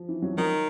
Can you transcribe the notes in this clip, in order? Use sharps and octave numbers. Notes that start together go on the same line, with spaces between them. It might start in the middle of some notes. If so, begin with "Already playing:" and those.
Already playing: F3
E3
F#3
F3
D#3 F#3